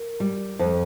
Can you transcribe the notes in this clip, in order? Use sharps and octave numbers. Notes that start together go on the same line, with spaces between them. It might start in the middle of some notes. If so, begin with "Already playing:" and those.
Already playing: A#4
G3
F2